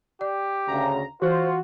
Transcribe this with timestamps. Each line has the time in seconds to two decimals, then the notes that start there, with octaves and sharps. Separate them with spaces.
0.21 G4 D5
0.68 D2 C#3 A#5
1.22 E3 F4 F#4 C5